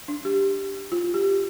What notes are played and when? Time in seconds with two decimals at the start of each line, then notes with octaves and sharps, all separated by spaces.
0.08 D4
0.25 G4
0.92 F4
1.14 G4